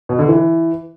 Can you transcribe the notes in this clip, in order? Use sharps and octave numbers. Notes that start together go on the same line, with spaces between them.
B2
D3
E3